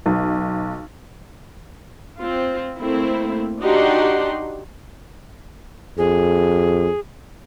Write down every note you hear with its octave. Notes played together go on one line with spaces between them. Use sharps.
B1
C4 F4
A3 A#3 C4 E4
D4 D#4 F#4 G4 F#5 C6
F2 G#4